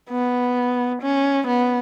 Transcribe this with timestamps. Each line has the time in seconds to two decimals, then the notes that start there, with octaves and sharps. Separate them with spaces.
0.10 B3
1.02 C#4
1.47 B3